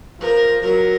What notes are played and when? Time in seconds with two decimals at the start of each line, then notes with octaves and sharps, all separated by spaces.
0.20 F3 A#4
0.62 F#3 A#4